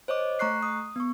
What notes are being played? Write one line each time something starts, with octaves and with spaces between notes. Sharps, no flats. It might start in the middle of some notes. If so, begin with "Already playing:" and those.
C5 C#5 D#5 D6
A3 A#5 C#6 F#6 C7
D#6
B3 C#6